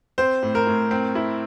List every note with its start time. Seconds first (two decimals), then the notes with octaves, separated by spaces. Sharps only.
0.18 C4 C5
0.43 A2
0.55 A#4
0.67 A2
0.91 C4
1.15 E4